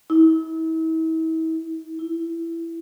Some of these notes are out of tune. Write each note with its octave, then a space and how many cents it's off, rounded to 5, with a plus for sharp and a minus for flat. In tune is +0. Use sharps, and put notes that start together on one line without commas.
E4 -40
E4 +15